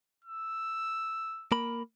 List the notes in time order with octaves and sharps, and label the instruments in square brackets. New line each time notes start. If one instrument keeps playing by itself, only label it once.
[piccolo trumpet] E6
[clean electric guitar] A#3 A#4 B5